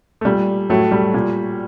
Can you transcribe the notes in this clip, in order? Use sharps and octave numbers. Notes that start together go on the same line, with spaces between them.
A3
A#2 G3
A2 F#3 A3
G3
A#2